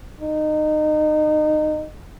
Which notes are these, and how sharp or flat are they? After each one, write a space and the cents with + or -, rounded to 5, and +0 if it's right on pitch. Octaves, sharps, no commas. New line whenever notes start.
D#4 -25